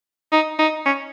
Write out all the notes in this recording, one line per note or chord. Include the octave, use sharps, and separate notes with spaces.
D#4
D#4
C#4